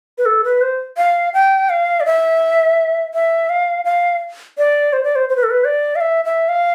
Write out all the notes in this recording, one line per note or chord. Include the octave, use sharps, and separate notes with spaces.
B4
A4
B4
C5
F5
G5
F5
D5
E5
E5
F5
F5
D5
C5
D5
C5
C5
B4
A4
B4
D5
F5
E5
E5
F5